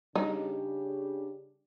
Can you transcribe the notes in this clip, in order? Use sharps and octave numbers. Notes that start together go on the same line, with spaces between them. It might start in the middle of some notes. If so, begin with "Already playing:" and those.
C#3 G3 D4 D#4 G4